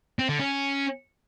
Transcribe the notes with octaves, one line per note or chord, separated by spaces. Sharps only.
C4
D3
C#4